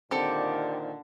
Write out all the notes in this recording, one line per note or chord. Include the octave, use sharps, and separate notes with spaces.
A#2 D3 D#3 C4 G4 A4 D5